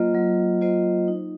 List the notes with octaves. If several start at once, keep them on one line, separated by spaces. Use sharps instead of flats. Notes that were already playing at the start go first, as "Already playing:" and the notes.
Already playing: F#3 A#3 F4 C5 D#5
F#3
A#3 F4 C5 D#5
D#4